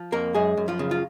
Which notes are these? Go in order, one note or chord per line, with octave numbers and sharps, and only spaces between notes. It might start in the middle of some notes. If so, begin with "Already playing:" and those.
Already playing: F3
F2 A#3 A#4
F#2 G#3 G#4
F#2
F3 F4
C#3
F4